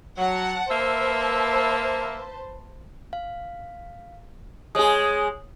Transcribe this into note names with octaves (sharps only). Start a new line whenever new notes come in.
F#3 F#5 A5
A#3 B4 C5 E5 A5
F5
G#3 G#4 C#5 D#6